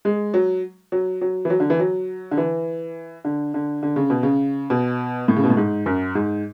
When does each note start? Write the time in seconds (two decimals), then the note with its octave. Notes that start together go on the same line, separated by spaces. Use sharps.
0.05 G#3
0.34 F#3
0.92 F#3
1.21 F#3
1.45 E3
1.50 F#3
1.60 D3
1.70 E3
1.80 F#3
2.31 D3
2.37 E3
3.25 D3
3.54 D3
3.83 D3
3.96 C#3
4.10 B2
4.23 C#3
4.70 B2
5.28 A2
5.36 C#3
5.44 B2
5.50 A2
5.57 G#2
5.86 F#2
6.15 G#2